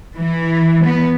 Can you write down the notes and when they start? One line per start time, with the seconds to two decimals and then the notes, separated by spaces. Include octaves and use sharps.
0.16 E3
0.85 B3